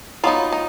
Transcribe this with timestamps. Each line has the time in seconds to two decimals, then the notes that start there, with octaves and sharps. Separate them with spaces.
0.24 F#3 B3 D#4 F4
0.52 D#4